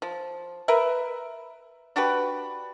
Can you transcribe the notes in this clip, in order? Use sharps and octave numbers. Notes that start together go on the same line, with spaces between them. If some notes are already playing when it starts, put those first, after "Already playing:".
F3
A#4 B4 E5
D4 F#4 G4 B4